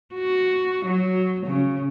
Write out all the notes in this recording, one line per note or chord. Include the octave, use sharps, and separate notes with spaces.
F#4
F#3
C#3